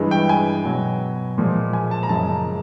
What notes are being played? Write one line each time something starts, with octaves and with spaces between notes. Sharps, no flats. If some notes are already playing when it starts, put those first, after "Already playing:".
Already playing: G2 E3 G#3
G5
G#5
B2 F#3
A#2 F3 G#3
G#5
A5
A#5
F#2 C#3 F3 G#3 A5